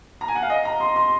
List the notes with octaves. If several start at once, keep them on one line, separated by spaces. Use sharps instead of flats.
A#5
G#5
F#5
F5
D#5
A#5
C6
C6